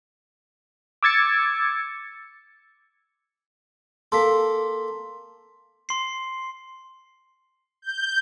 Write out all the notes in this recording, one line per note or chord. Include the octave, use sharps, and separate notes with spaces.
D6 E6 G#6 A6 C#7
A#3 A4 C6 B6
C6 C7
G6